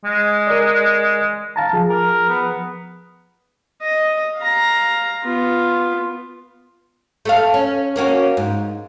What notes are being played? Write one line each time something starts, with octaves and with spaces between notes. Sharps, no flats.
G#3
A#4 D5
F5 A5 A#5
F3 G#4
A#4
B3
D#5
F5 A#5
B3 F4
A3 A4 F5
C#4
A#3 C#4 F#4
G#2